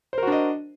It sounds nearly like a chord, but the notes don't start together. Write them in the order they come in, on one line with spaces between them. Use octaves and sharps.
C5 A#4 F#4 D4 D#5